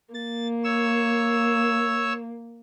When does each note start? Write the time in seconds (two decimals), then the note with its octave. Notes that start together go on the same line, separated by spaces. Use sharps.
0.14 A#3 A6
0.64 C#5 E6